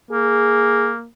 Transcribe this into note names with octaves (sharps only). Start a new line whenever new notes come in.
A#3 G#4